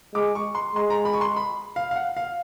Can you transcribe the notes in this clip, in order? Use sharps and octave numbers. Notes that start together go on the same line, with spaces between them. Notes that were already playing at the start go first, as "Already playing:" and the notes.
G#3 D6
C#6
C6
G#3 C6
A#5
B5
C#6
C6
B5
F5
F5
F#5
F5